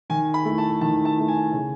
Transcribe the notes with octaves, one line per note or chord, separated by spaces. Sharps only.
D#3 G#5
B5
A3 E4
A5
D#3 A5
A5
A3 E4
G#5
C#3